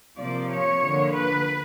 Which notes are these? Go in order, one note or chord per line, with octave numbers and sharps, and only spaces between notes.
C3 F3 A#3 D5
C#5
D3 F3 A#3
B4